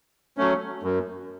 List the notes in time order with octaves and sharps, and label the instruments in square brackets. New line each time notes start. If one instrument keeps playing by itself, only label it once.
[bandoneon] F#3 A3 C#4
F#2